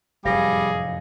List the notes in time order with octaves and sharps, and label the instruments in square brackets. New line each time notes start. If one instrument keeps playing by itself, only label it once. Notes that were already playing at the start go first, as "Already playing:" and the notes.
[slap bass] F1 F#2 A2 [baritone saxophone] G3 [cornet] G#4 [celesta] F5 A#6